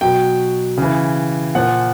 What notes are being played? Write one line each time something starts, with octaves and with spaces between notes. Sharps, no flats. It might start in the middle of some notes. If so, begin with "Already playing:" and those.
B2 F#3 G5
C#3 E3
A#2 F3 F#5